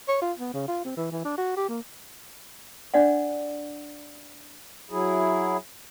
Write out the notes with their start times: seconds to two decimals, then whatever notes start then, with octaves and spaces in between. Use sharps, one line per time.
0.08 C#5
0.22 F4
0.39 B3
0.54 C#3
0.68 F4
0.85 C4
0.97 E3
1.12 E3
1.25 D4
1.37 F#4
1.56 G4
1.69 A#3
2.94 D4 D5 F#5
4.91 F#3 E4 G#4